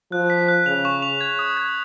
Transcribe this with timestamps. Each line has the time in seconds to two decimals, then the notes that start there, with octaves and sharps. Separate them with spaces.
0.12 F3 F#6
0.30 B6
0.48 F#6
0.66 C#3 F7
0.85 C#6
1.02 F7
1.21 G#6
1.39 D#6
1.57 G#6